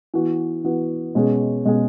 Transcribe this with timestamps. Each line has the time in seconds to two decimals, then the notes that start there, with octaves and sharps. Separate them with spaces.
0.14 E3 B3 F#4
0.64 E3 B3 F#4
1.15 B2 G#3 C#4 G#4
1.65 B2 G#3 C#4 G#4